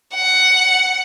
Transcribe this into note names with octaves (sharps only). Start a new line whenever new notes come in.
F#5